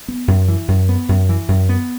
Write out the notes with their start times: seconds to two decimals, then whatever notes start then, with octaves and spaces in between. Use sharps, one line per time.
0.08 B3
0.28 F#2
0.48 E3
0.68 F#2
0.89 B3
1.09 F#2
1.29 E3
1.48 F#2
1.69 B3